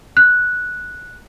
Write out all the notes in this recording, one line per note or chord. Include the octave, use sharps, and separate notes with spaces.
F#6